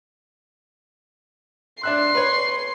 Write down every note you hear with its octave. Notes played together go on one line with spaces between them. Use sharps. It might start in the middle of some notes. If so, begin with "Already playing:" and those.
D4 E5 C6 F#6
B4 C#5